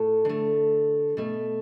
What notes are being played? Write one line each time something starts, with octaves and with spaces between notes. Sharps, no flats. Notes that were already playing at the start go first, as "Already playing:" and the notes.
Already playing: A2 A3 A4
D3 A3
B2 A3